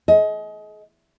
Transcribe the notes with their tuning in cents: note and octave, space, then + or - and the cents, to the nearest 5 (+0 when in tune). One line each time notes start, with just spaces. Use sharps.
G#4 +40 D#5 +25